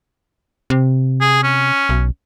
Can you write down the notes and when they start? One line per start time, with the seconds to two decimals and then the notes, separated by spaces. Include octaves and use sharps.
0.70 C3
1.21 G#4
1.44 C#4
1.89 B1